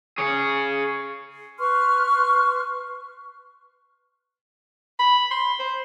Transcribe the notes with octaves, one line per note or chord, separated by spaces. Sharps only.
G#4 C#5
B4 C6 C#6 F6
B5
C6
C5